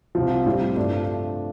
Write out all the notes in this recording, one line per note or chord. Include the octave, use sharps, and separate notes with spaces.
C2 C3 F3
A2 G3 C4
G2 F3 A3 D4